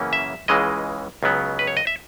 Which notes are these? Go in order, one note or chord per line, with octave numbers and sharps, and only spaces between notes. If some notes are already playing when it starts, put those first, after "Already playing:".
Already playing: F#2 C#3 E3 A#3 C#4
E5
C#2 C#3 E3 G#3 D#5
C#2 C#3 F#3 B3
B4
C#5
D#5
E5